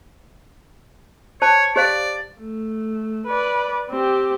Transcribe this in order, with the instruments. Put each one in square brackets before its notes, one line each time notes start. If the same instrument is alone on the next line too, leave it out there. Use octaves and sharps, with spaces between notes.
[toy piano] C5 A5 [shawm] C#5
[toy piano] G4 C5 F5 [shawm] D5
[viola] A3
B4 D5
C4 G4